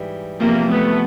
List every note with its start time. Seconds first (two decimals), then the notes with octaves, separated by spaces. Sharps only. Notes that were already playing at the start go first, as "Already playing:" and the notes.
Already playing: G#2 E3 G3
0.40 E2 C3 F3 A#3
0.71 A3 B3